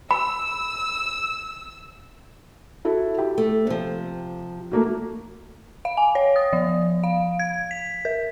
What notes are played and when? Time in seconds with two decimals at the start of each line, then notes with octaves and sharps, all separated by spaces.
0.11 B5 E6
2.85 E4 F#4 A4
3.18 G4
3.38 A3
3.67 C3 F3
4.72 A3 A#3 F#4
5.85 F5
5.97 G#5
6.15 C#5
6.36 D#6
6.53 F3
7.03 F5
7.39 G#6
7.71 B6
8.05 A#4